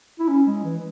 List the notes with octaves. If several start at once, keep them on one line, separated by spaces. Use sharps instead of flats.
E4
C#4
G#3
E3